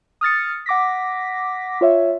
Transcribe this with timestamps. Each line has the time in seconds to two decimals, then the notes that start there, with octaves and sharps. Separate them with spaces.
0.21 D#6 F6 A6 C#7
0.66 F#5 D6 A#6 B6
1.81 F4 C#5 E5